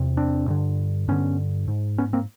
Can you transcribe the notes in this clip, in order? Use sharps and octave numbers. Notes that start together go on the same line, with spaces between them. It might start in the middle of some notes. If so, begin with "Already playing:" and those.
Already playing: E2 C3
C4 D4
G2 D3
G2 D3 B3 C#4
G#2
B3 C#4
A#3 C4